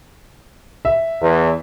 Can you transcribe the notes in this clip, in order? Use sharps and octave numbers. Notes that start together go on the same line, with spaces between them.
E5
E2